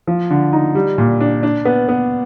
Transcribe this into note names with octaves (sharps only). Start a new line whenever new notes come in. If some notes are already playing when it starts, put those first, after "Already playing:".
F3
D3
D#4
G3
A#2
D4
D4
B3
B3